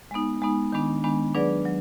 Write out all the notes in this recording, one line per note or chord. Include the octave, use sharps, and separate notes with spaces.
G#3 B3 D#4
G#3 B3 D#4
D#3 G#3 B3 D4
D#3 G#3 B3 D4
F#3 D4 G#4 B4 D5
F#3